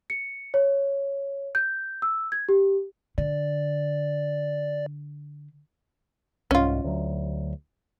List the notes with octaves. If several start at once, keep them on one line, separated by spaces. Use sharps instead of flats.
C#7
C#5
G6
E6
G#6
G4
D3 D5
C2 G#2 C#4 F4
D2 F#3